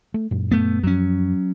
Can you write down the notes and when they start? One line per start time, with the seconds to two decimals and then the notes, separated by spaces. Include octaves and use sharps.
0.14 A3
0.31 F#2 A#2
0.51 A3 B3
0.83 F#2 F3 F#3 C#4